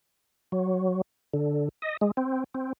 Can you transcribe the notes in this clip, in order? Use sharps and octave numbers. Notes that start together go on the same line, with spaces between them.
F#3
D3
D#5
G#3
C4
C4